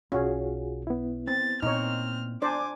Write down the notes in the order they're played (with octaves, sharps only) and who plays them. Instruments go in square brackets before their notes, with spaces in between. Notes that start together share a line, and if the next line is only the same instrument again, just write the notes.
[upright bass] B1 [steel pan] C#4 [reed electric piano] F4 F#4 G#4
[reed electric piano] B3 E4
[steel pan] C4 [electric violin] A6
[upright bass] A#2 [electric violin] C4 F6 [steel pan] D#4 C#5
[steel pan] D4 C5 D5 [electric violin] G#5 D6